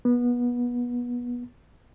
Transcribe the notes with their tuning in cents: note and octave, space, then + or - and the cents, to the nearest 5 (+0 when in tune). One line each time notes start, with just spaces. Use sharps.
B3 -25